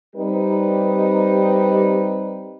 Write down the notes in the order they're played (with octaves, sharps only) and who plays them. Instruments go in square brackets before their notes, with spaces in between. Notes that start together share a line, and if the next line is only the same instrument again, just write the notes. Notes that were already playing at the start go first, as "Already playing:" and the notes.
[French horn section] G3 C4 D#4 G4 B4